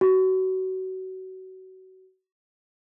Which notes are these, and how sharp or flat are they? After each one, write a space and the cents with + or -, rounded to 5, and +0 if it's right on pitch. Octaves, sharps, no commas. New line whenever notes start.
F#4 +25